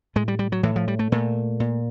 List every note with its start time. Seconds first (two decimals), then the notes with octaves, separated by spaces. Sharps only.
0.16 A2 G#3
0.28 G3
0.39 G3
0.52 F#3
0.63 A2 E3
0.76 F3
0.88 G3
0.99 A3
1.12 A#2 A3
1.60 A#2